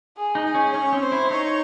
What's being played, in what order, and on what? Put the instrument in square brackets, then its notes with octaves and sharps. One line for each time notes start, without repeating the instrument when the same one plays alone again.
[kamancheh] G#4
[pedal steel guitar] D#4
[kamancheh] G#4
[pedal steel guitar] C#4
[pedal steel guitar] C#4 [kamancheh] C#5
[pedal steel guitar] C4
[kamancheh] C5
[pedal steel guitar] E4
[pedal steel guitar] D#4 [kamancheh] C#5